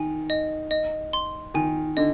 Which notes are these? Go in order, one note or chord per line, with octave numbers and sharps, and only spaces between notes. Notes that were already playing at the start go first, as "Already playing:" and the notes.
Already playing: D#3 G#5
D#5
D#5
C6
D#3 G#5
D3 D#5